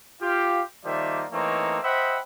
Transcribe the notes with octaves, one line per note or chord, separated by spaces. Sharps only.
F4 G4 F5
D#3 F3 G3 A#3 D5 E5
E3 A3 A#3 C4 D#4 C#5
C5 D#5 E5 F#5 G5 B5